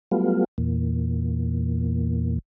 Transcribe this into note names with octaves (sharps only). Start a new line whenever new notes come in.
F#3 G3 A3 B3 F4
E2 A#2